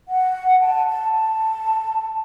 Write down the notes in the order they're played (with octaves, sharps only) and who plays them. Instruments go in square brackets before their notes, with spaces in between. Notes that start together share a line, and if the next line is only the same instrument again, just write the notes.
[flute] F#5
A5
A5
A5